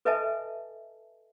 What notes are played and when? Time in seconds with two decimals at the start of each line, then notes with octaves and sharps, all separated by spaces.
0.05 A4 B4 D#5 E5 G#5 A5